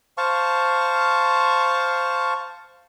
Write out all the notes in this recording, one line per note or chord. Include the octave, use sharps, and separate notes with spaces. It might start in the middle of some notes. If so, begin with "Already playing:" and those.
C5 F5 A5 C#6